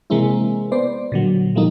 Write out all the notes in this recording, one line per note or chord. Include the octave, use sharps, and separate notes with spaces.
C3 E3 G#3 A#3 C4 E4
B3 C5 D5
A#2 D3 F#3
E3 F3 G3 A3 A#3 D#4